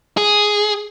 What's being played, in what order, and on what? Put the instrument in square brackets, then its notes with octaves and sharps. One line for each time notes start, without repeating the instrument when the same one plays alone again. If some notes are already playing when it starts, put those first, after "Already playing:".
[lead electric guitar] G#4